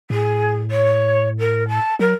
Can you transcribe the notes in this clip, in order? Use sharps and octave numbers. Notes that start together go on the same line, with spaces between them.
A2 G#4
C#5
A#4
A5
F#3 A#4